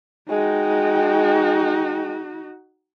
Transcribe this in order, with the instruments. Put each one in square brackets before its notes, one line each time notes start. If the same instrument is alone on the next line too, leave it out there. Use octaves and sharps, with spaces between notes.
[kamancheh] G#3 G5 [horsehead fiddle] D#4 F#4